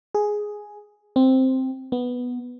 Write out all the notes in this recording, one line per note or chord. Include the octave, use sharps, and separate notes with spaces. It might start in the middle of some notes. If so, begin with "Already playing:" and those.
G#4
C4
B3